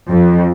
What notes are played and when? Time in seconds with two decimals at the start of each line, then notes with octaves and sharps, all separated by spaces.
0.10 F2